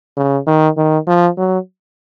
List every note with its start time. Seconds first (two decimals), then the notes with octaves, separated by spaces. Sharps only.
0.17 C#3
0.47 D#3
0.77 D#3
1.07 F3
1.37 F#3